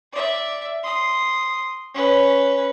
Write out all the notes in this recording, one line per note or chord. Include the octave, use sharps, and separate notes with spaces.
D5 E5
C6 D#6
C#4 B4